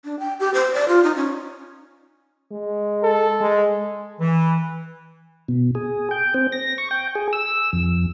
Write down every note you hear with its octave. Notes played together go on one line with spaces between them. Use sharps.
D4
G5
G4
C5
D5
F4
D#4
C#4
G#3
A4
G#3
E3
B2
G#4
G5
C4
A#6
C#6
G5
G#4
E6
F2